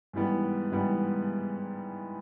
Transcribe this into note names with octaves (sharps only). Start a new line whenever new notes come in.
G#2 E3 G3 B3
G#2 E3 G3 B3